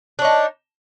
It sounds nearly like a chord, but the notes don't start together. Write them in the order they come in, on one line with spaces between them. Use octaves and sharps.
D4 C#5 D#4